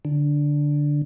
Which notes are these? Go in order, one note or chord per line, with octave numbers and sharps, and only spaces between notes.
D3